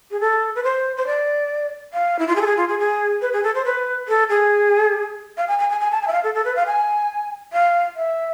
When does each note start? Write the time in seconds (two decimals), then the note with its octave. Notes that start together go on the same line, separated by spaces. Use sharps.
0.11 G#4
0.20 A4
0.55 B4
0.64 C5
0.97 C5
1.06 D5
1.93 F5
2.19 E4
2.27 F4
2.36 G#4
2.41 A4
2.46 G#4
2.57 F4
2.68 G#4
2.79 G#4
3.22 B4
3.33 G#4
3.43 A4
3.54 C5
3.65 B4
4.08 A4
4.29 G#4
5.37 F5
5.48 G#5
5.59 G#5
5.70 G#5
5.80 G#5
5.91 A5
6.02 G#5
6.07 E5
6.12 F5
6.24 A4
6.34 A4
6.45 B4
6.56 F5
6.67 G#5
7.53 F5
7.96 E5